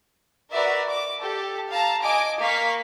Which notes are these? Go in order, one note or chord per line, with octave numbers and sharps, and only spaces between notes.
F#4 A#4 B4 D5 E5
D6
G4 A4
F5 A5 A#5
D#5 G#5 D6 D7
A#3 F5 C#6 B6